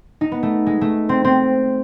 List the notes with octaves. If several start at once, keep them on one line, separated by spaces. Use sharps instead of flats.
D#4
B3
A3
G#3
A3
C4
C4